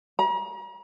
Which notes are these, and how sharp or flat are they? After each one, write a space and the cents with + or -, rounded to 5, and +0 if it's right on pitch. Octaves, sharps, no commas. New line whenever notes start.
A#5 +40